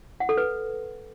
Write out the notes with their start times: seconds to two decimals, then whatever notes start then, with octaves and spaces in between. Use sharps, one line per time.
0.20 F#5
0.29 A4
0.38 B4